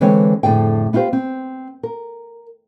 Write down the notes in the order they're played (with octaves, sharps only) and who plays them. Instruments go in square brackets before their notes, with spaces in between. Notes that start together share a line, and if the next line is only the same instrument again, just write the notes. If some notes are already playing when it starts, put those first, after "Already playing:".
[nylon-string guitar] D3 E3 G#3 C4 C#5 G5
F2 A2 D3 G#4 G5
B3 E4 F4 G4 C5
C4
A#4